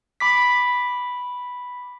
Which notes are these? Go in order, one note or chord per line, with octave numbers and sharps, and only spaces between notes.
B5 D6 B6